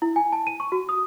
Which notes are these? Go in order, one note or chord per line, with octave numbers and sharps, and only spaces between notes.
E4
G#5
A5
D#7
C#6
F#4
D#6